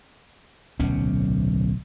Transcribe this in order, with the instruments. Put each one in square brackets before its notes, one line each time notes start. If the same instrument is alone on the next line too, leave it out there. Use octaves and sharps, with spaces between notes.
[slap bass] D1 B1 C3 C#4